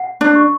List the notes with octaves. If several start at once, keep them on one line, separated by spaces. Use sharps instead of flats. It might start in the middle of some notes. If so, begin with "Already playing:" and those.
Already playing: F#5
D4
C#6